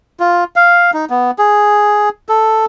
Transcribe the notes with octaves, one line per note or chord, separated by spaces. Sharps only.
F4
F5
D#4
B3
G#4
A4